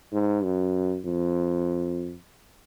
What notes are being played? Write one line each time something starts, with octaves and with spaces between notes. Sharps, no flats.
G#2
F#2
F2